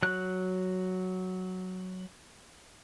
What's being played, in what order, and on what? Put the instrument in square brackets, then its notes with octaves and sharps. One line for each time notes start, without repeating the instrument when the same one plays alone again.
[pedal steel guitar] F#3 F#6